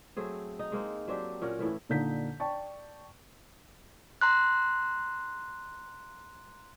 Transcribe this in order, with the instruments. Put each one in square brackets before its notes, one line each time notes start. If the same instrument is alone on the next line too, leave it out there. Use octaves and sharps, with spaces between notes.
[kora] F#3 A3 C4 G#4
D#4
G#3 A#3 C4
F#3 C4 D4 G4
A#2 C#4 A#4 F#5
A2 E3 A3
[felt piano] A#2 D3 D#4 G6 B6
D5 G5 A5 C#6
[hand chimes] A#5 C6 F#6